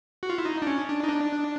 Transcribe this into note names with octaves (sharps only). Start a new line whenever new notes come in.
F#4
F4
E4
D#4
D4
C#4
D4
D#4
D4